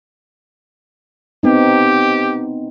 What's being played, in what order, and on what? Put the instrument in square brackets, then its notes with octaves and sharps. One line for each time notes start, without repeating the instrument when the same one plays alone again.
[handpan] B3 C4 D#4 [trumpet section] G4